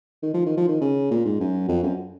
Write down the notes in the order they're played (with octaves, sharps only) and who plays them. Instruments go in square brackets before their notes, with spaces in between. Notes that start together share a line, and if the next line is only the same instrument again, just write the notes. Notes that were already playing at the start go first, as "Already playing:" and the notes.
[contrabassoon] D#3
F3
D#3
F3
D#3
C#3
A#2
G#2
F#2
F2
F#2